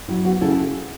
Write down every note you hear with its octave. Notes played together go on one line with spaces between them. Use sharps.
F#3 E4
B3 F#4
C#3 E4 A4